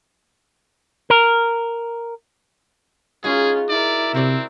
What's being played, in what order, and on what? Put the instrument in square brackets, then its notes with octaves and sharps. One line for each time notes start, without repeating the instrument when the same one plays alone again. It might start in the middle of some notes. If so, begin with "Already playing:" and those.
[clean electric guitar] A#4
[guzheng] G#3 D#4 F#4 [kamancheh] C#4 F4 [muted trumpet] G#4
[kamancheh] E4 A#4 [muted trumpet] D5
[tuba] C3 [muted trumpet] C4 [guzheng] F#4 D5